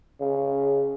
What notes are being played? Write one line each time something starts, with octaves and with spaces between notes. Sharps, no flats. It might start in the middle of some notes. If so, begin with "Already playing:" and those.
C#3